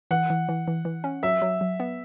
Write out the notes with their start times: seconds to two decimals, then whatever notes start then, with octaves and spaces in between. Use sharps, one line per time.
0.11 E3 F#5
0.30 E3
0.49 E3
0.68 E3
0.85 E3
1.04 C#4
1.23 F#3 E5
1.42 F#3
1.61 F#3
1.80 B3